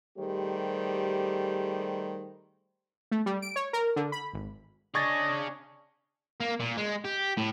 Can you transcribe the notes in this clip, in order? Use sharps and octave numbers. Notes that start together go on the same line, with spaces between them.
D#3 G3 A3 G4 G#4 C5
A3
G3
D7
C#5
A#4
D3
B5
G#1
C#4 D4 G#4 D#5 C#6 G#6 A6
A#3
A#2
G#3
G4
A2